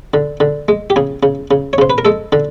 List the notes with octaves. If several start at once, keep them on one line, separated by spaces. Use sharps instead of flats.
D3
D3
G#3
G4
C#3 G#4
C#3
C#3
C#5
C#3 C5
B4
A#4
G#3 A4
D3